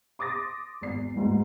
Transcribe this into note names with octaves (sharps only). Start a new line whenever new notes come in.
C6 D6 D#6 A6 A#6
G#1 E2 D5 C7
D2 G#2 E3